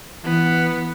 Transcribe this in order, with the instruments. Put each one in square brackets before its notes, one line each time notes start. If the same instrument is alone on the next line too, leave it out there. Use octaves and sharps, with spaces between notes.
[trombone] E3 [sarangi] B3